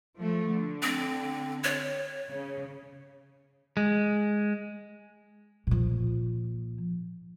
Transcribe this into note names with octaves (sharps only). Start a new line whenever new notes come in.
F3 A3
D3
C4
C#5
C#3
G#3
A#2 F3